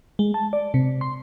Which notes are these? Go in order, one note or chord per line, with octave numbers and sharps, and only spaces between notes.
G#3
A5
D5
C3
C6